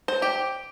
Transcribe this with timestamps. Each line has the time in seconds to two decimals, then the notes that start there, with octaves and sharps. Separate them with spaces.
0.08 C5
0.22 G4